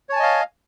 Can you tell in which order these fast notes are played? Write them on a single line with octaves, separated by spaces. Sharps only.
C#5 A5 G#5 D#5 F5